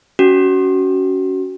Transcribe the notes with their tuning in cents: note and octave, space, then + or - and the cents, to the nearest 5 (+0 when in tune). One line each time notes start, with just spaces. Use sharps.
C#4 +20 F#4 +20